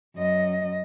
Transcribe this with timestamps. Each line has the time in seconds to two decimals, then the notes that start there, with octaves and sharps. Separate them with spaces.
0.16 F#2 D#5